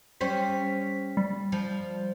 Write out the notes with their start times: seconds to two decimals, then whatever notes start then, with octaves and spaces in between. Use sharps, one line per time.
0.21 G3 C#4 C5 B6
1.17 G3
1.52 F3